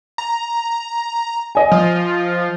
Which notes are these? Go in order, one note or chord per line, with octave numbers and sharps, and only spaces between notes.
A#5
D#5 G#5
F3